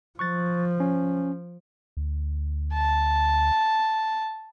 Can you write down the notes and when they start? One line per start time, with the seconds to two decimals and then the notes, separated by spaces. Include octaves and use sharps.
0.19 F3 C#6 F#6 A6
0.80 C#4
1.97 D2
2.74 A5